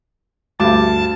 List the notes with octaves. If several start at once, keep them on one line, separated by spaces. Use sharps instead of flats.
D2 G2 A5 D6